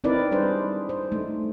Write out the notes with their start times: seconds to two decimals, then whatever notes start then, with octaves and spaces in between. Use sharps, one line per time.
0.04 C4 D#4 E4 A#4 B4 D5
0.31 G3 D4 G#4 B4 C5
0.89 C5
1.12 A3 D#4